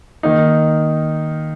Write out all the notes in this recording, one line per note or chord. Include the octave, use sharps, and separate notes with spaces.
D#3 A#3 D#4